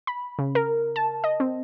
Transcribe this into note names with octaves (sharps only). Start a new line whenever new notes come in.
B5
C#3
A#4
A5
D#5
C4